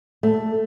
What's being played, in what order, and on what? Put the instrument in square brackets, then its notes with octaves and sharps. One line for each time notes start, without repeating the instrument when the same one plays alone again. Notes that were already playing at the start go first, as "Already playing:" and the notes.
[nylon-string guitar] A3